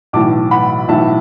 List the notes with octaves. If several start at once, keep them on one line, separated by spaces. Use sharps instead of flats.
B1 A2 E3 A5 D6
F#5 B5
B1 A2 E3 E5 A5